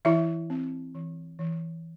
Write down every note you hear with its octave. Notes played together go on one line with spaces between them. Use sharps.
E3 E4 E5
C4
E3
E3